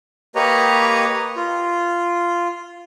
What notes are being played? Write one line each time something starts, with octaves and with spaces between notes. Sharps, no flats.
A#3 G4 B4 C#5 D#5 A#5
F4